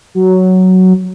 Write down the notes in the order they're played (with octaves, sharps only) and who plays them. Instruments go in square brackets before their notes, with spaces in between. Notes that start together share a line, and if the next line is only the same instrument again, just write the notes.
[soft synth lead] F#3